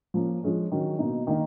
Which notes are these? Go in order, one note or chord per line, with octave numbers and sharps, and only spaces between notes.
F3 A#3 C#4
F3 G#3 C#4
D#3 F#3 C#4
B2 A#3 D#4
D#3 A#3 D#4